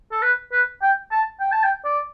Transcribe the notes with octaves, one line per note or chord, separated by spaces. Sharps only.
A4
B4
B4
G5
A5
G5
A5
G5
D5